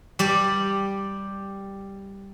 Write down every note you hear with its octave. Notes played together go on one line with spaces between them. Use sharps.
G3 G4 D5